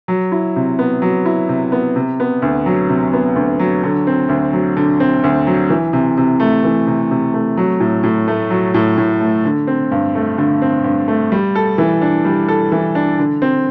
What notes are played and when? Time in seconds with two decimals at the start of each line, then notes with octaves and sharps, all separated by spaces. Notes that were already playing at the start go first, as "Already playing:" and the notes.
0.08 F#3
0.32 E4
0.56 C3
0.79 B3
1.02 F#3
1.26 E4
1.49 C3
1.72 B3
1.96 C3
2.20 B3
2.42 D2
2.66 F#3
2.89 C3
3.13 B3
3.36 D2
3.60 F#3
3.83 D3
4.07 C4
4.29 D2
4.53 F#3
4.77 D3
5.00 C4
5.24 D2
5.47 F#3
5.70 E3
5.93 C3
6.17 C3
6.40 A3
6.64 E3
6.87 C3
7.11 C3
7.34 A3
7.57 F#3
7.80 A2
8.03 A2
8.27 A3
8.50 F#3
8.74 A2
8.98 A2
9.20 A3
9.45 D3
9.67 C4
9.91 G2
10.15 A3
10.38 D3
10.62 C4
10.84 G2
11.08 A3
11.32 G3
11.55 A4
11.78 E3
12.02 D4
12.25 G3
12.48 A4
12.72 E3
12.95 D4
13.19 D3
13.42 C4